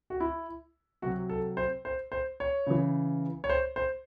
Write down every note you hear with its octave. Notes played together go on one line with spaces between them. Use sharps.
F#4
E4
C3 F#3 F#4
A4
C5
C5
C5
C#5
C#3 E3
C#5
C5
C5